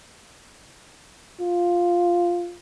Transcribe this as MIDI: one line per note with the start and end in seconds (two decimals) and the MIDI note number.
1.41 2.55 65